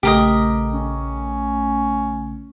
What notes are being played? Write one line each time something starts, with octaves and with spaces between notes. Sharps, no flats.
A#1 C#3 A3 G4 A#4 D#5
C#4